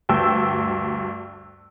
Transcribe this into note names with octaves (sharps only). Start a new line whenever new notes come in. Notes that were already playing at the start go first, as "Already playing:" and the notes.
D2 G2 G5 E6